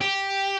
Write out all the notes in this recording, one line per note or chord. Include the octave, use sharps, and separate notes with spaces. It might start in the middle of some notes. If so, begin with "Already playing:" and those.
G4